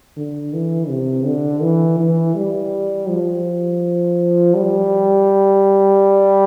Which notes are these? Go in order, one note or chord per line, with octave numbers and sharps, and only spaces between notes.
D3
E3
C3
D3
E3
E3
G3
F3
G3